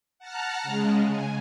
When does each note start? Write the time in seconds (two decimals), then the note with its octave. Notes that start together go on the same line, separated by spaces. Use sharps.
0.19 F#5 A5 A#5 F6 F#6
0.63 C#3 G#3
1.08 G#5